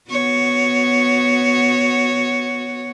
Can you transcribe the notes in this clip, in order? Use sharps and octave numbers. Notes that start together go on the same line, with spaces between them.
B3 F#4 C#5